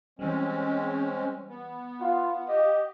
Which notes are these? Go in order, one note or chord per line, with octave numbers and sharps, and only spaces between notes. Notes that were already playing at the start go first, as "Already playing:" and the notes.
E3 G3 G#3 C4 C#4
B3
F4 F5 F#5
G4 D#5